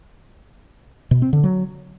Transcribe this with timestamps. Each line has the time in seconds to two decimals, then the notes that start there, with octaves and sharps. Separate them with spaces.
1.11 B2
1.22 C4
1.33 D3
1.44 F#3